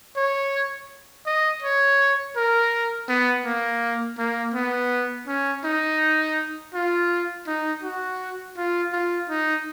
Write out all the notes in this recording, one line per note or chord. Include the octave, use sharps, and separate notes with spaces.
C#5
D#5
C#5
A#4
B3
A#3
A#3
B3
C#4
D#4
F4
D#4
F#4
F4
F4
D#4